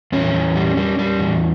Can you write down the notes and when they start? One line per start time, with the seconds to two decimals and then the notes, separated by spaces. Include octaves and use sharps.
0.12 E2 C#4
0.34 E2
0.56 G3
0.77 G3
0.99 G3
1.19 E2